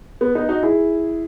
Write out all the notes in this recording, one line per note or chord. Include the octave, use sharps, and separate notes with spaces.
B3
B3 D#4
D#4 F#4
E4 G#4